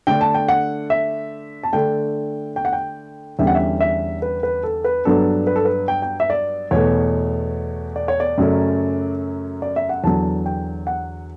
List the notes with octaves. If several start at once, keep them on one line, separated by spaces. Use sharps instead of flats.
D3 A3 D4 G5
A5
G5
F#5
E5
A5
D3 A3 D4 G5
G5
F#5
G5
E2 D3 G3 C#4 E5
F#5
E5
E5
B4
B4
A4
B4
G2 F#3 B3 D4 A4
B4
A4
B4
G5
G5
E5
D5
E2 B2 A3 C#5
D5
C#5
D5
F#2 C#3 F#3 A3 C#4
D5
E5
F#5
E2 D3 F#3 A5
G5
F#5